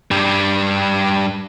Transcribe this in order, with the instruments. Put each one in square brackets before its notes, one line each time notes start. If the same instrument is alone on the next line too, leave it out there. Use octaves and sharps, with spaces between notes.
[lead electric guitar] G2 G3